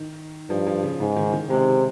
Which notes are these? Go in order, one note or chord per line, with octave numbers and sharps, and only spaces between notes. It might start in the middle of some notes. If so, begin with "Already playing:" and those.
Already playing: D#3
G2 F3
F3
C#3
G#2 C#3
D#3
D#3
C3 G#3